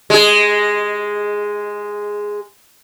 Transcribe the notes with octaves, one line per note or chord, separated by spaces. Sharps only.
G#3 G#4